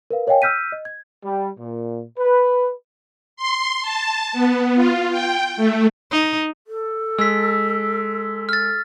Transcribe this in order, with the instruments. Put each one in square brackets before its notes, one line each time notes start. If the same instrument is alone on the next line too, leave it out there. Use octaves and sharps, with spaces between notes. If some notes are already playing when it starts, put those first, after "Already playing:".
[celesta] A#4 B4 F5
A#4 C#5 D#5 F5 G5 G#5
E6 F6 G6 B6 D#7
D#5
G#6
[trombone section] G3
A#2
B4
[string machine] C6
A5
B3
F4
G5
A3
[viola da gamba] D#4
[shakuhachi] A4
[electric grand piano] G#3 [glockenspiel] E6 B6
[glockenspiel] F6 A6